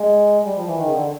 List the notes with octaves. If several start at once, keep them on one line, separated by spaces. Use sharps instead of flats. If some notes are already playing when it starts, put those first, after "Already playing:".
Already playing: G#3
G3
F3
E3
D#3
C#3
D3